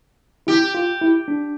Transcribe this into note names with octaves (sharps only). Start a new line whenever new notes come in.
E4 G4
F4
E4
D4